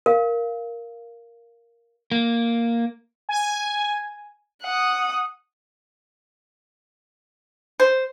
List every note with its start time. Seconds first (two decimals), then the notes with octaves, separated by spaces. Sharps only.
0.06 A#4 F5
2.12 A#3
3.29 G#5
4.63 F#5 D#6
7.80 C5